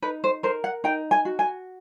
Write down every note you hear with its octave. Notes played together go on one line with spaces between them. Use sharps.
D#4 B4
C5
A#4 C5
F#5
D#4 G5
G#5
F#4
G#5